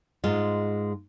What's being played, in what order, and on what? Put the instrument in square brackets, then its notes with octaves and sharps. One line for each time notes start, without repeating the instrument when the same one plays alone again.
[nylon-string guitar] G#2 G#3 F4